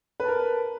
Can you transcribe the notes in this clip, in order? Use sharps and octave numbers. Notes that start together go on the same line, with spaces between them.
A#4 B4 A5